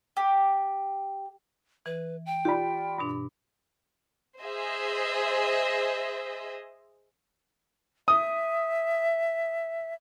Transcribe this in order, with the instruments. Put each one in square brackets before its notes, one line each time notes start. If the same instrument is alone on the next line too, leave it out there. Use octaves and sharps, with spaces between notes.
[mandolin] G4
[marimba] E3 [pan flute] B4
[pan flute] G5
[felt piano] F4 D5 B5 [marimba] G4
[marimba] G2 B2 D4
[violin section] G#4 C5 D#5 E5
[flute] E5 [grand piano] D#6